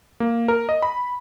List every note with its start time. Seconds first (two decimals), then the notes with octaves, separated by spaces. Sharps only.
0.20 A#3
0.48 A#4
0.69 D#5
0.82 B5